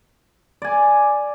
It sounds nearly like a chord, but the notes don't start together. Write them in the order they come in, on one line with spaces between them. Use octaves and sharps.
D5 G#5 D6